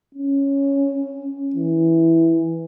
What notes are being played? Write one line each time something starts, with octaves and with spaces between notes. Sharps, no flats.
C#4
E3